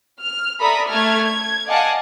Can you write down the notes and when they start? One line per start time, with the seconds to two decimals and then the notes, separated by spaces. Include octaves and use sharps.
0.20 F6
0.60 A4 D5 E5 A#5 B5 D#6
0.90 A3 A5 F6 G#6
1.24 G#6
1.67 D5 D#5 F5 F#5 G#5 A5